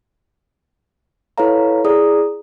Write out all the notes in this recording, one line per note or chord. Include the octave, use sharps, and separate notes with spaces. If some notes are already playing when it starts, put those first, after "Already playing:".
E4 A4 B4 C#5 F5 A#5
E4 G#4 D5 A#5 D#6